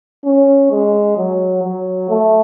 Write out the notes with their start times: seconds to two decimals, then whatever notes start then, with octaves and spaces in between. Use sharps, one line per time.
0.25 C#4
0.71 G#3
1.17 F#3
1.63 F#3
2.09 A3